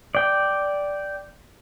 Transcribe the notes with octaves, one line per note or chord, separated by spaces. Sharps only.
D5 G5